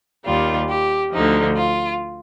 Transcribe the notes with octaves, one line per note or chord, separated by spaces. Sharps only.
D#2 D#3 G3 F4
G4
D2 D3 F3 D#4
F4